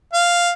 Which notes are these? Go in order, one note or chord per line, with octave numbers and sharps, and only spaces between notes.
F5